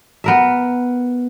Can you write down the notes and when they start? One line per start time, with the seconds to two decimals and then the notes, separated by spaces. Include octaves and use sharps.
0.24 B3 A#4 E5